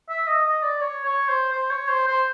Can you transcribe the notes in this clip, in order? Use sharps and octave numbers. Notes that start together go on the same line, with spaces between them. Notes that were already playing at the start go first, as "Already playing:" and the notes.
E5
D#5
D#5
D5
C#5
C#5
C5
C5
C#5
C5
C5